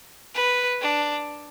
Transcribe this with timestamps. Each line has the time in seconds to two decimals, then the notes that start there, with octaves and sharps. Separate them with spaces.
0.35 B4
0.81 D4